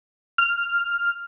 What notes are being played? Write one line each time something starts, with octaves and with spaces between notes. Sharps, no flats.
F6